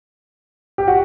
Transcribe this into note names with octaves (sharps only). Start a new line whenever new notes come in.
G4
F#4